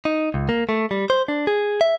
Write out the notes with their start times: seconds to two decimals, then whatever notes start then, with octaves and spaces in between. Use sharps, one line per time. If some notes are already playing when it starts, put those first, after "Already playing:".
0.05 D#4
0.34 C#2
0.49 A#3
0.69 A3
0.91 G3
1.10 C5
1.28 D4
1.47 G#4
1.81 E5